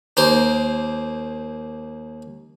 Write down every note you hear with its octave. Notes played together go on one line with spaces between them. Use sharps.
D#2 A#3 C5